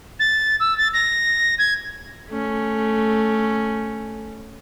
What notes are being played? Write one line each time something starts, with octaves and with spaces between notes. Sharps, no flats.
A6
E6
A6
A#6
G#6
A3 C#4